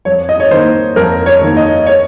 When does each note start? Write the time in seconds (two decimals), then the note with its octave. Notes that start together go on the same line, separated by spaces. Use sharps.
0.05 F2 C#5
0.29 D#5
0.40 C#5
0.51 D#3 A#3 C5
0.96 F2 A#4
1.26 C#5
1.41 D#3 A#3
1.57 D#5
1.86 C#5